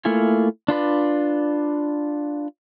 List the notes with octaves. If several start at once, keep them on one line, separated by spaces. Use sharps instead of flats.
A3 A#3 E4 F4 G#5
D4 F4 B4 D5